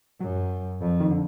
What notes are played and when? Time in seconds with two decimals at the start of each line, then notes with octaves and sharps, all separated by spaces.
0.20 F#2 F#3
0.80 F2
1.00 D#3
1.11 D3